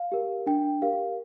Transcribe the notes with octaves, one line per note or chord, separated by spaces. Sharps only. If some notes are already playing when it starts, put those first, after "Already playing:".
Already playing: F5
G4 A#4
D4 G5
G4 A#4 F5